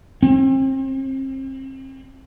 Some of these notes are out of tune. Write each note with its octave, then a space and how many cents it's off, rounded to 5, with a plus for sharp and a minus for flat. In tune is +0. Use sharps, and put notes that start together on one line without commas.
C4 +35